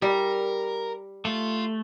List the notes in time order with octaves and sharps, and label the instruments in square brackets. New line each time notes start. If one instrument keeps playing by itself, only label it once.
[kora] G3 [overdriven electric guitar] A#4
[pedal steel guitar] A3 [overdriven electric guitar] F4